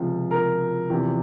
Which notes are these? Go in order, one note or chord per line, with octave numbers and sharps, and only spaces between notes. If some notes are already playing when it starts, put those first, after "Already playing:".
Already playing: C#2 C3 F3
A#4
E2 C3 F3